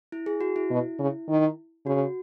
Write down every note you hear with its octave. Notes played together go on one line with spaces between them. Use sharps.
E4
G#4
F#4
E4
B2
C#3
D#3
C#3 F#4